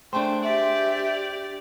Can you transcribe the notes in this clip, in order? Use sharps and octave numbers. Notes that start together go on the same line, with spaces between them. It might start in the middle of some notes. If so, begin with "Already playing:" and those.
A3 D4 G#4 C5 G5
G4 D5 E5